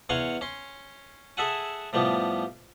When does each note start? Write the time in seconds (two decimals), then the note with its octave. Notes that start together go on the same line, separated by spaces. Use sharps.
0.09 E2 C#5 F5 F#5 G#5 C6
0.41 C#4 C6
1.37 G#4 A4 E5 F#5 G#5
1.93 A2 F3 G3 B3